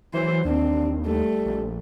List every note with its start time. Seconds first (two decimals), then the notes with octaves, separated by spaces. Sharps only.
0.14 E3 F#3 C5
0.45 D#2 C4 D4
1.06 G3 A3
1.46 A#1